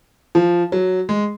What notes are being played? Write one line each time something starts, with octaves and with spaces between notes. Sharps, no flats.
F3
F#3
G#3